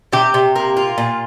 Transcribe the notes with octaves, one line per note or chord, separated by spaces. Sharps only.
C3 G4
C3
A#3
F4
A#2